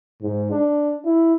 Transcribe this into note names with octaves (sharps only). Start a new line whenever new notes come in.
G#2
D4
E4